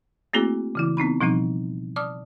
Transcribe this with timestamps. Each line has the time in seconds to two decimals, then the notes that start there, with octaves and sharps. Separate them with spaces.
0.33 A3 A#3 C4 E4 F#4 G#4
0.75 C#3 E3 E4
0.97 B3 C4 D#4 B5
1.21 B2 F3 G3 C4 D#4
1.96 D5 A5 D6 D#6 F6